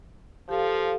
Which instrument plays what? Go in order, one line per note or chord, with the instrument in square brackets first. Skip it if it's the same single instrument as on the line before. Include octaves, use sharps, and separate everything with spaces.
[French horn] F3 [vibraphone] G4 A4 F5